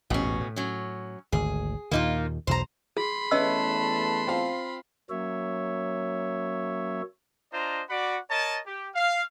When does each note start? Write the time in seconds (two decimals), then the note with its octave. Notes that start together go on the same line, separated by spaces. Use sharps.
0.10 A1 E2 G#2 B2 C#4
0.40 A2
0.56 F#3 C#4
1.32 G#1 D2 G#4
1.91 D#2 A#2 D#3 A#3 D#4 F4
2.47 B1 E2 B2 C5 A#5
2.97 G#4 B5 C6
3.31 E2 A3 C#4 B4 D#5 E5 A5 E6
4.27 C4 F4 F5
5.10 F#3 A#3 C#4 C#5 E5
7.53 D4 F4 C5 D#5 A#5
7.90 F#4 D5 F#5 B5 D6
8.30 A#4 C#5 D#5 A5
8.66 G4
8.95 F5